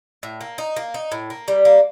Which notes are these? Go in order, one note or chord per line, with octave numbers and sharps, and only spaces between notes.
A2
A#3
D#4
A#3
D#4
A2
A#3
G3
A#3